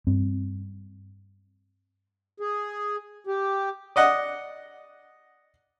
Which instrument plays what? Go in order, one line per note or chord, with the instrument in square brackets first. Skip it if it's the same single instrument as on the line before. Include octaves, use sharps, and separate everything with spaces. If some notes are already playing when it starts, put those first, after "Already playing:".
[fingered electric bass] G2 C4
[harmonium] G#4
G4
[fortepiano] D5 D#5 F#5